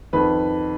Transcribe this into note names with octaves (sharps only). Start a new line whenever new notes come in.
F2 D#3 B4